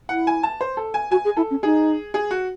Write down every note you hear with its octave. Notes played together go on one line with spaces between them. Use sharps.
E4 F#5
G#5
A5
C5
A4
G#5
F#4 G#5
G#4
E4 A4
C#4
D#4 G#4
G#4
F#4